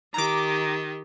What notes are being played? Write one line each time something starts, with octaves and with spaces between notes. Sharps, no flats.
D#3 G4 A#5 D6